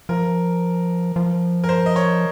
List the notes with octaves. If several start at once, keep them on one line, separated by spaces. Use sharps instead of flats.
F3 A#4
F3
A#4
C5
D#5
C#5